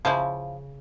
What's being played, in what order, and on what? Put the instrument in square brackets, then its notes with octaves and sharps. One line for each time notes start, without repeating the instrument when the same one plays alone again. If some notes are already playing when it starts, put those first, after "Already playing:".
[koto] C#3 [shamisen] F3 E4